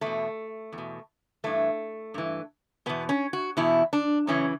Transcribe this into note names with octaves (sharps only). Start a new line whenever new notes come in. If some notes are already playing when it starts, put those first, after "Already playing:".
E2 B2 A3
E2
B2
G2 E3 A3
G2 E3
E2 B2 B3
C#4
F#4
E2 B2 E4
D4
F#2 C#3 E3 C#4